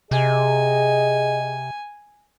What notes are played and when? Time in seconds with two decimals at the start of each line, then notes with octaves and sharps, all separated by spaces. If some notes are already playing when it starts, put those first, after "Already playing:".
0.11 C3 G#4 D#5 G#5